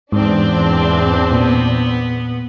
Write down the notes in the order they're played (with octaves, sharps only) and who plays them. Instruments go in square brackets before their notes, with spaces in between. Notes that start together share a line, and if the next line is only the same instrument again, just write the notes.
[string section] E2 C4 D4 [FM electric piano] G#2
[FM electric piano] A#2 [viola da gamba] B3